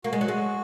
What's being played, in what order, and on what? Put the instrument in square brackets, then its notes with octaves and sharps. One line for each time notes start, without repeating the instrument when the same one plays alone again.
[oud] A#3 [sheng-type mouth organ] F#4
[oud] G#3
F#3
[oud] G#3 [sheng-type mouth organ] F#4